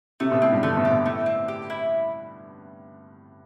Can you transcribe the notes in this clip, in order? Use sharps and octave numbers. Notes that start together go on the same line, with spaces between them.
C3 A3
B2
A2 C4
G2
D3 A3
B2
G4
B2
A2 A3
C4
G4
E4